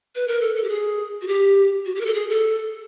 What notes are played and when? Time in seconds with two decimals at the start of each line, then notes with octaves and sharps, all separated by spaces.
0.15 B4
0.28 A#4
0.41 A4
0.56 A4
0.64 G4
0.69 G#4
1.22 F#4
1.27 G4
1.86 F#4
1.95 G4
2.01 A#4
2.06 A4
2.14 G#4
2.29 A4